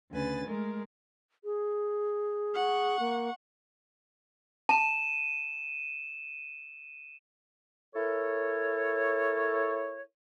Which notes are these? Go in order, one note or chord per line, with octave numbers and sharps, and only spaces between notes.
D2 C#3 B4 G#5 A6
G#3 A3 A#4
G#4
F#5 C#6
A#3
A5 D#7 E7
E4 A4 A#4 C#5